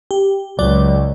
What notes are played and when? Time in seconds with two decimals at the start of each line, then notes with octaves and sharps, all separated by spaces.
0.11 G4
0.59 C#2 F#3 D5